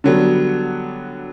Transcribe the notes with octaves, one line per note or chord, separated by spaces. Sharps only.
D3 F#3 G3 B3